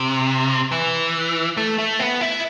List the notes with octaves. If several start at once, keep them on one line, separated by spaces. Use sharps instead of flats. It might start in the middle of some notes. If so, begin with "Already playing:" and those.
Already playing: C3
E3
A3
A3
B3
E4